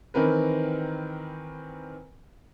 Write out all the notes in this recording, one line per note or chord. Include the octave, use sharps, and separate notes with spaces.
D#3 E3 C4 A#4 B4